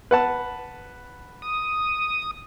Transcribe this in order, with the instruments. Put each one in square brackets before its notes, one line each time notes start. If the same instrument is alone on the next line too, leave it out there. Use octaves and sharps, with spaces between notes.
[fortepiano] B4 F#5 A5
[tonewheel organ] D#6